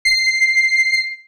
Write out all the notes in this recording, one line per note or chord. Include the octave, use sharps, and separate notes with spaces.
C7